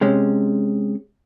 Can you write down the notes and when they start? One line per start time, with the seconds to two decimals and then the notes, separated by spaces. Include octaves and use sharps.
0.01 C3 G#3 C#4